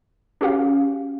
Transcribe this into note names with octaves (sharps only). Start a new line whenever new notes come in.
C#4 F#4 G4 F5